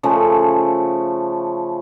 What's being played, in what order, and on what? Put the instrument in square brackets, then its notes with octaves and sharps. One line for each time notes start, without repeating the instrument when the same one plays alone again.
[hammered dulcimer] C#3 F3 A3